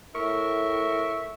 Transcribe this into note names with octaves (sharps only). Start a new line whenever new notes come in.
A2 A#4 E5 C#6